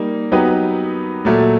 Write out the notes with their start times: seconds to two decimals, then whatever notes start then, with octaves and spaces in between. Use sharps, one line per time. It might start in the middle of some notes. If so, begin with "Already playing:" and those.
Already playing: G3 A#3 D#4
0.32 F#3 B3 D#4 G4 B4
1.25 A#2 F#3 A3